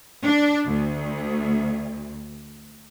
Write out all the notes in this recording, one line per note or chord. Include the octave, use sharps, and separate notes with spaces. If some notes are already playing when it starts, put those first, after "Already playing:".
D4
D2